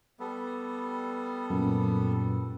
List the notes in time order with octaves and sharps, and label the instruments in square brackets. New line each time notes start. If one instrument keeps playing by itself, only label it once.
[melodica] G3 B3 A4
[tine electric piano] F#2 A#2